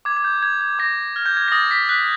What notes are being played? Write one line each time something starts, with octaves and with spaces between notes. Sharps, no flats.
D6 G#6
G#6
G6
G6 G#6
G#6
D6 A#6
F6 G#6
G6
G#6
A#6
D#6 A6
B6
F#6 B6